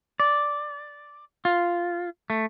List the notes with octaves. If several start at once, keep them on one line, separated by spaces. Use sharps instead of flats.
D5
F4
A3